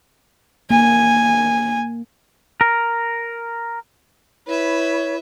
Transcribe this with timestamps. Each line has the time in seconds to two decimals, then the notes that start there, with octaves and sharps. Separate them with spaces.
0.70 A#3 G#5
2.61 A#4
4.47 E4 B4 C#5 E5